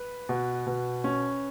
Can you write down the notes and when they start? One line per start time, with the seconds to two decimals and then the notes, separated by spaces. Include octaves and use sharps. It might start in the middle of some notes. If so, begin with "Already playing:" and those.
Already playing: B4
0.29 B2
0.67 B2
1.04 C#4